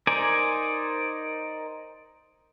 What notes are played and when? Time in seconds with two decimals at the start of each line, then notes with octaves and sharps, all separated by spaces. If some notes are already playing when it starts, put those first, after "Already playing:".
0.07 D#4 A#4 C5 D5 G#5